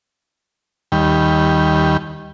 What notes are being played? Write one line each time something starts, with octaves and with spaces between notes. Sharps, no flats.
D#2 G3